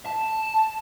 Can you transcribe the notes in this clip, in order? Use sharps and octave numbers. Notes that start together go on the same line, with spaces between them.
A5